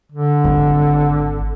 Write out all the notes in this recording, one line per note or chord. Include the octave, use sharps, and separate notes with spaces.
D3
G#1